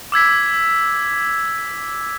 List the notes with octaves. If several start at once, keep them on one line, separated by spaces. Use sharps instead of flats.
D6 E6 G#6 B6